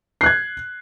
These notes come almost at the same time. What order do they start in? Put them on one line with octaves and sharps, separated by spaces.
C7 F#6 G#6